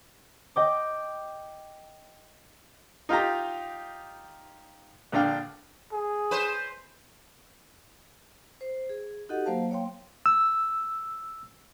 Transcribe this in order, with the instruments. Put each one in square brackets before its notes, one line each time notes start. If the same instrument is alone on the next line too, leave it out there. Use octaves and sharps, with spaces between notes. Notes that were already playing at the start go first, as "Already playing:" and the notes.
[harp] D#5 G5 D6
[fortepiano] D#4 F4 G4 A#5
A#1 D3 D4 F5 G5
[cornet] G#4
[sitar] B4 C5
[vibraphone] C5
G#4
D#4 F#4 G4 A4 D#5 F#5
F#3 A#3 C5 F5 A5
A#3 C#5 F5 G5 C6
[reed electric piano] E6